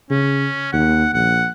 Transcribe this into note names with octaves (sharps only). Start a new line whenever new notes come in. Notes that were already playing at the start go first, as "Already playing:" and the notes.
C#3 C#4
D#2 F#5
A#1 F#5